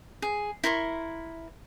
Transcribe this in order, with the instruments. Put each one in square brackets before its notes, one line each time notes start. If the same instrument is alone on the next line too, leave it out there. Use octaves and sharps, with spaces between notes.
[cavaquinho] G#4
E4 A#4 C6 C#6